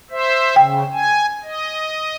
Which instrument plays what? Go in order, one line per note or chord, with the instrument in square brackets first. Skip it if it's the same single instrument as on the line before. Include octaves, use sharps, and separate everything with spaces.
[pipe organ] C5 E5
[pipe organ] C#3 [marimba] G5
[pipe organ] G#5
D#5